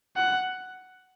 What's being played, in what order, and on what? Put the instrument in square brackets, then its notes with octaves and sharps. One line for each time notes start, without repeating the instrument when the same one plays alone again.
[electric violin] F#5